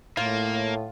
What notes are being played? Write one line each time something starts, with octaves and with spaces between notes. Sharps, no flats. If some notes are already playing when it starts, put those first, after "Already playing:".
A2 A#3 F4